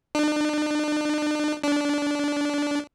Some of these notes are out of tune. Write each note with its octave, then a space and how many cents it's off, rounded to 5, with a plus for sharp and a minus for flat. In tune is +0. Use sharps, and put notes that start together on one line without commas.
D4 +40
D4 -15